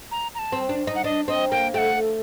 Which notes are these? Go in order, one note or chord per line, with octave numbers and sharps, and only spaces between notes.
A#5
A#5
A5
C4
D4
D#4
F#5
D4 D#5
C4 D#5
A#3 G5
A3 F#5 G5